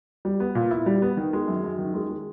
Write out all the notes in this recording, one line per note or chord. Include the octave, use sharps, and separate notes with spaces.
G3
B3
A#2
E4
G3
B3
D#3
G#3
F#2
F#2
D#3
G#3
G#3